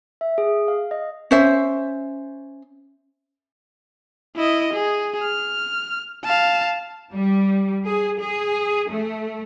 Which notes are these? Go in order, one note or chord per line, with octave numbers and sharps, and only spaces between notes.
E5
G#4
F5
D#5
C#4 C5 E5
E4 D#5
G#4
F6
F5 A5
G3
G#4
G#4
A3